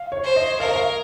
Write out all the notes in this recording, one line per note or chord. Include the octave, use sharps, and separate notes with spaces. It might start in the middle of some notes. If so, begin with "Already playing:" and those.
Already playing: F5
C#5
C5
D#5
A#4 F5
D#5
F5